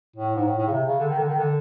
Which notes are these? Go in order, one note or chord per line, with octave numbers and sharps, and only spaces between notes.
A2
G#2
A2
A2
C#3
C3
C#3
D3
D#3
D3
D#3
D3